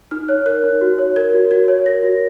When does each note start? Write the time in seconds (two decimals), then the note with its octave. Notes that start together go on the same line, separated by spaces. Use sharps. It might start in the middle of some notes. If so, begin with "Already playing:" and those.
0.11 D#4 F6
0.28 C#5 F#6
0.46 A#4 F#6
0.64 D#4
0.81 F#4
0.98 C#5
1.16 A#4 G#6
1.33 F#4
1.51 F#4 G#6
1.68 C#5
1.86 A#4 A#6
2.03 F#4